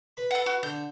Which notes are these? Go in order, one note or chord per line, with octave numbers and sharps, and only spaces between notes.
B4 B5
A4 F#5
F#4
D3 G6